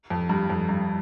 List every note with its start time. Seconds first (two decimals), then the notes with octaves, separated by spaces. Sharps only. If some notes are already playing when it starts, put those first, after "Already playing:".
0.10 F2
0.30 G2
0.50 F2
0.69 G2